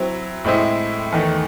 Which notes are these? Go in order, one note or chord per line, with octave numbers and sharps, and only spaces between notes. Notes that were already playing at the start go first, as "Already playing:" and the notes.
Already playing: F#3 C4 E4
A2 G#3 C4 E4
E2 D#3 A3